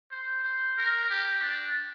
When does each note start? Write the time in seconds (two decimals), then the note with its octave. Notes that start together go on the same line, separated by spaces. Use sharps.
0.11 C5
0.44 C5
0.77 A#4
1.10 G4
1.42 D4